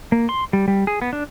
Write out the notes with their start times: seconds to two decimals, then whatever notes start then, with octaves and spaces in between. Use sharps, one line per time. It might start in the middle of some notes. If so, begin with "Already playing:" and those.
0.12 A#3
0.29 C6
0.53 G3
0.68 G3
0.87 G#4
1.02 B3
1.13 D4